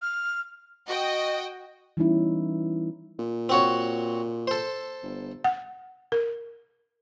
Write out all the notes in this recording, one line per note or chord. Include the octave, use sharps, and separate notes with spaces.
F6
F#4 D#5 G5
E3 G3 B3 C#4 D#4 E4
A#2
C4 F#4 C#5
A4 C5
G1
F#5
A#4